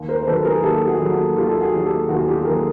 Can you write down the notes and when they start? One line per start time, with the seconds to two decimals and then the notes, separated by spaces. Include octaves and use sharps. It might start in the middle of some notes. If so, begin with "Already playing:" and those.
Already playing: D#2
0.08 A#4 C5
0.22 C5
0.27 D#3 F#3 A4 B4
0.45 G#4 A#4
0.55 G#4
0.63 D#2 G4 A4
0.87 F#4 G#4
1.00 D#3 F#3
1.12 F#4
1.36 D#2 F4 G4
1.49 A4
1.60 F#4 G#4
1.73 D#3 F#3
1.84 G4 A4
2.09 D#2 F#4
2.19 G#4
2.27 F4 G4
2.45 D#3 F#3 G#4 A#4